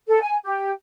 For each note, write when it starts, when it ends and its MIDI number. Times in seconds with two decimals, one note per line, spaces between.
0.08 0.22 69
0.22 0.35 80
0.44 0.70 67